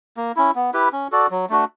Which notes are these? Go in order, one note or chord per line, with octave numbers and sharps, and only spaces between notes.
A#3
C#4 E4
B3
E4 G4 B4
C#4
F#4 A4 D5
F#3
A3 D4 F#4